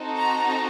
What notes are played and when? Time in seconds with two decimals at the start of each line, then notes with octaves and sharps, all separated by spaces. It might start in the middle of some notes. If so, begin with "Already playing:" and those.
Already playing: C4 D#4 F#4 A4
0.17 A#5